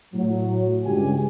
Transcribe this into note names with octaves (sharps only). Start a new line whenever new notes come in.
A2 F#3
C#2 G2 G4 G#5